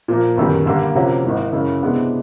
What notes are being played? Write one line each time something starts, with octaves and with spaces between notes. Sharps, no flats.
A#2 F3 A#3
G1 F#2 D#3 G3
G2 D3 G3 A#3
C3 F3 A#3 C#4 F#4
G#1 G#2 E3
F#2 C#3 E3
C3 E3 G#3 B3 D4